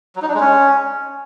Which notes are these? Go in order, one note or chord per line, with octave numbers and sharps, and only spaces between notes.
F#3
D#4
D4
G#3
C#4